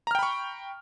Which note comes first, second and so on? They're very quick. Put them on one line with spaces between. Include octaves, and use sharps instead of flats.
A#5 F6 G5 B5 C#6